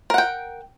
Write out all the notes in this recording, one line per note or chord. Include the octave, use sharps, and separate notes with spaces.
A#4 F#5 G5